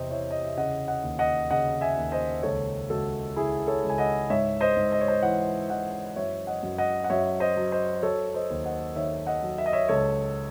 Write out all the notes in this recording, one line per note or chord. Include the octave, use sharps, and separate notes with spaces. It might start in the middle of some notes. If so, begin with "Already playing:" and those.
Already playing: E2 C3 C5 D#5
E3 C#5 E5
D#5
E5
C#3 D#5 F#5
D#5 F#5
D#2
D#5 F#5
C#3 D#5 F#5
E5 G#5
D#2
C5 D#5
C#2 A4 C#5
C#2 F#4 A4
C#2 E4 G#4
A4 C#5
C#2
G#5
D#5 F#5
G#2 C#5 E5
C5 D#5
G#2
D#5
C#5
C5 D#5
E3 D#5 F#5
E3 D#5 F#5
F#2 C#5 E5
D#5 F#5
F#2
D#5 F#5
F#5
F#2 C#5 E5
C5 D#5
F#3
C5 D#5
F#3 A4 C#5
C5 D#5
D#2
D#5 F#5
D#3 C#5 E5
D#5 F#5
F#3
E5
D#5
C#5 E5
C#2 A4 C#5